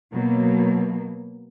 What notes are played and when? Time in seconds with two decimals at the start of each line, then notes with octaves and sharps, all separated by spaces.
0.13 B2 F#3 A#3